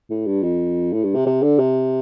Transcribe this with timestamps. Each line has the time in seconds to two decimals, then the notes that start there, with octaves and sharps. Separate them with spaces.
0.10 A2
0.26 G2
0.43 F2
0.93 A2
1.04 G2
1.15 C3
1.26 C3
1.42 D3
1.59 C3